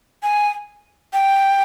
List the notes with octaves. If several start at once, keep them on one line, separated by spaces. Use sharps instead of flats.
G#5
G5